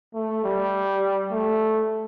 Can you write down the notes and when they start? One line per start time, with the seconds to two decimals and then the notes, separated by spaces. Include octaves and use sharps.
0.14 A3
0.44 G3
1.32 A3